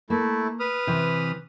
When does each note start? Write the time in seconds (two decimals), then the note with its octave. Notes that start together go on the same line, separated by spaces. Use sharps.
0.10 A3 A#3 E4
0.60 B4 D#6 F6
0.87 C3 E3